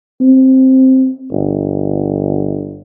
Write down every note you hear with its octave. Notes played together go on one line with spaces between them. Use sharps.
C4
G1